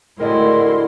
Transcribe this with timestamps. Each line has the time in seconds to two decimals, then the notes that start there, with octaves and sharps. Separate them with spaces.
0.20 A2 D3 G#3 C4 E4 F#4 A#4 C6